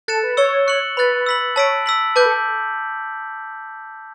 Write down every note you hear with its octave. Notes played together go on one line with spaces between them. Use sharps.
A4 F#6 A6 C#7 E7
B4
C#5 C#6 E6 A6 C#7 G7
F#6 C#7 F#7
B4 B5 F#6 A6
E6 B6 F#7
C#5 A5 E6 B6 D7
E6 B6 F#7
B4 A5 D6 G6
A4